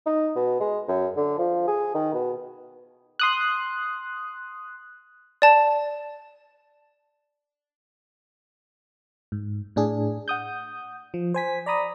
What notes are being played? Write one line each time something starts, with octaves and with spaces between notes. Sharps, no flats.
D#4
B2
G#3
F#2
D3
F3
G#4
D#3
B2
C6 D#6 F#6
D5 A5
G#2
A2 D4 G#4
F#5 D#6 G6
F3
C5 G#5 B6
D5 A#5 B5 D#6